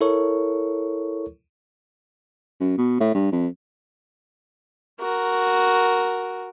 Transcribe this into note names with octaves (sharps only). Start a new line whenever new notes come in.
E4 A4 A#4 C#5 C#6
F#2
B2
A2
G2
F2
F#4 A#4